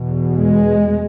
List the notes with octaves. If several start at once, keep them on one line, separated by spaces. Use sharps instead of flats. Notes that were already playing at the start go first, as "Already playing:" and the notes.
Already playing: E2 B2
G#3